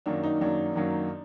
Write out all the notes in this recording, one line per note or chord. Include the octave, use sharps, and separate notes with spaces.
F#2 D#3 F#3 A#3 D4
D#4
F#2 D#3 F#3 A#3 D4
F#2 D#3 F#3 A#3